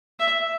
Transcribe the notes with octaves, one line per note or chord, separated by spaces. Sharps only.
E5